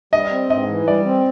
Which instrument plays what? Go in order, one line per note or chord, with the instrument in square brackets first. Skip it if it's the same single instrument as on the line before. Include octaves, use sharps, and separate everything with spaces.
[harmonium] G3 [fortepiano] D#5
[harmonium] C4
[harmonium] G#2 [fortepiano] D#5
[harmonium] E3
[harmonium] G3 [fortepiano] D5
[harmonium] C4